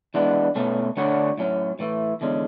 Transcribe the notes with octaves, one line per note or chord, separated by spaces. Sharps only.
E3 G#3 B3 D4
B2 A3 C#4
D3 A3 D4 F#4 C#5
A2 F#3 C#4
A2 E3 A3
E2 D3 G#3 C#4